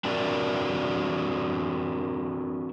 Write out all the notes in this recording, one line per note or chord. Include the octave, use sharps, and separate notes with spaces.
C4 D4 F#4 G4 A#4 D5